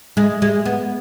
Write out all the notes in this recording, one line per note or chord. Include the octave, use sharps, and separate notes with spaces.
G#3
G#3
B3